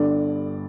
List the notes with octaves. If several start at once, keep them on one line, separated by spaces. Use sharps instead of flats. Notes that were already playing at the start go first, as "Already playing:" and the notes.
Already playing: G1 G2 D3 D5